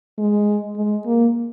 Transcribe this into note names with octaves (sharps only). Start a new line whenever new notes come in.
G#3
G#3
A#3